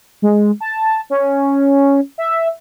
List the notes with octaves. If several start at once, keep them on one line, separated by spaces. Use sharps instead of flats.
G#3
A5
C#4
E5